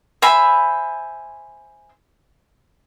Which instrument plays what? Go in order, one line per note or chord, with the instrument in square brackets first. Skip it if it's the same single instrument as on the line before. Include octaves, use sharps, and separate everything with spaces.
[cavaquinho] C5 E5 G#5 B5